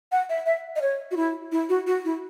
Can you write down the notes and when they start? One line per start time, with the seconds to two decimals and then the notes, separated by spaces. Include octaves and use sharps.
0.12 F#5
0.29 E5
0.46 E5
0.76 D#5
0.82 C#5
1.11 F#4
1.16 E4
1.52 E4
1.69 F#4
1.87 F#4
2.05 E4